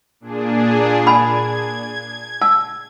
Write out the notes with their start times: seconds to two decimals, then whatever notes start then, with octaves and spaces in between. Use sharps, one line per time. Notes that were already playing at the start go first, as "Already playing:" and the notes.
0.20 A#2 D4 G#4
1.07 G#5 B5 G#6
2.42 A5 E6